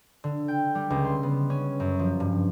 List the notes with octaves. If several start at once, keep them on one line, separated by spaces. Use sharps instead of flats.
D3
G5
G3
C#2
C6
B3
C#4
F#2
F3
G2